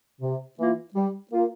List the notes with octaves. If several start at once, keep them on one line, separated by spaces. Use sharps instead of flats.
C3
E3 A#3 F4
G3
A#3 F4